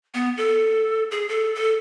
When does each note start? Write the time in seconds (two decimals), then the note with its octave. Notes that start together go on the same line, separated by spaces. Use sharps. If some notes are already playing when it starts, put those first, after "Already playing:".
0.14 B3
0.37 A4
1.11 G#4
1.29 A4
1.55 A4